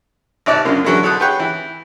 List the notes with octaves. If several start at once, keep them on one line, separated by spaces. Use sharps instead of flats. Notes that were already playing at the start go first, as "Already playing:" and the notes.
G#1 C3 D5 A5 F#6
C#2 F#2 D3 A#3
D3 E3 F#3 G#3 A#3
B1 A4 F#5 D#6
G4 G#4 B4 C#5 F#5 G5
E3